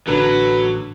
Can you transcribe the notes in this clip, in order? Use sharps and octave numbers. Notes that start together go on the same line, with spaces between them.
A1 D3 F#3 B4